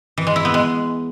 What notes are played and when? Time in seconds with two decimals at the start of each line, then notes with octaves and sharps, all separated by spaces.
0.18 E3
0.27 G#3
0.36 E4
0.45 B3
0.54 G#3